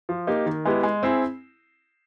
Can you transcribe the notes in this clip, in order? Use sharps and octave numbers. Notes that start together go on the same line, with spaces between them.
F3
A#3 D#4 G4
D#3
G#3 B3 E4 G4
G#3
C4 E4 G#4